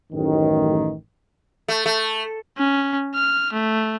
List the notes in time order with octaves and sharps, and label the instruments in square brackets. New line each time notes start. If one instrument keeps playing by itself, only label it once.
[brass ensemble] A1 F#2 D#3
[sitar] A3
A3
[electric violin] C#4
F6
A3